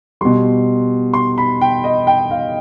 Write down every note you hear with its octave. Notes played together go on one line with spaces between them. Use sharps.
B2 G3 C6
C6
B5
G5
D#5
G5
F5